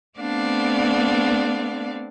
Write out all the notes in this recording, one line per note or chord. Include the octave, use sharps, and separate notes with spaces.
A3 B3 C4 D4 D5 F5